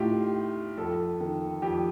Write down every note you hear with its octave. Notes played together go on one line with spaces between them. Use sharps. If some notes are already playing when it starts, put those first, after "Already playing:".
Already playing: A2 D#4 F4 G4
F2 A4
D#3
F2 G4